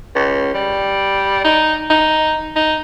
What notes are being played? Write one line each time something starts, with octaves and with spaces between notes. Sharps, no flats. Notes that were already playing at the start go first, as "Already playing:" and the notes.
C#2
G3
D#4
D#4
D#4